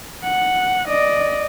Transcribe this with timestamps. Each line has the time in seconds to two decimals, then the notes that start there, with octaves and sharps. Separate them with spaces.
0.24 F#5
0.89 D5 D#5